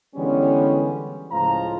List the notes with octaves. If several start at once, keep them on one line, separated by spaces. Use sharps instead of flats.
D3 E3 G3 G#3 B3 C#4
C#2 A2 F3 F4 A#5